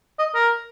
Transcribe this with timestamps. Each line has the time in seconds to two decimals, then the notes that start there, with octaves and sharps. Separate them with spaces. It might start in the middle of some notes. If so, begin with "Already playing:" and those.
0.19 D#5
0.35 A#4